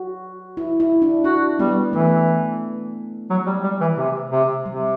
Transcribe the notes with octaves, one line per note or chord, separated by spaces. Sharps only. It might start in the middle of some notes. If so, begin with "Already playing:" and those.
Already playing: F#4
E4
E4
D4
D4 F#4
G3 B3
E3 A3
F#3
G3
G3
E3
C3
C3
C3 G3